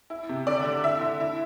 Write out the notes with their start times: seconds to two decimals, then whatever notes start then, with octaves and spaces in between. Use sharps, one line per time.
0.10 E4
0.29 C3
0.47 D3 D5
0.65 D3
0.84 E4 E5
1.01 D3
1.20 E4